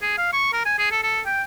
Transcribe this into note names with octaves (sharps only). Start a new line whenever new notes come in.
G#4
F5
C#6
A#4
G#5
G#4
A4
A4
G5